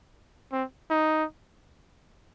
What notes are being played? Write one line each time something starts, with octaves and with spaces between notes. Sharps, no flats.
C4
D#4